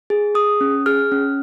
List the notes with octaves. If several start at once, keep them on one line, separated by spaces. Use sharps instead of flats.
G#4
G#4 D#6
C#4
G#4 F6
C#4